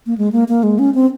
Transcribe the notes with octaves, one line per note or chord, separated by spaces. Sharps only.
A#3
G#3
A#3
A#3
G#3
C#4
C4